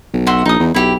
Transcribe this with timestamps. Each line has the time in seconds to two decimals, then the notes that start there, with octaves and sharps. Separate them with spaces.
0.13 B1
0.27 F#4 E5 C6
0.45 A#1 D#4 D#6
0.59 E2
0.74 B1 E4 G4